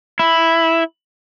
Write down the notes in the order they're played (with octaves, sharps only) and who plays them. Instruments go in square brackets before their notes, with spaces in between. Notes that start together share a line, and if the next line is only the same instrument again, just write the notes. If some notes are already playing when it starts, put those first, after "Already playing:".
[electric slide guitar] E4